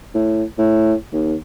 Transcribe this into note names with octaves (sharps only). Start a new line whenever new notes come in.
A2
A2
D#2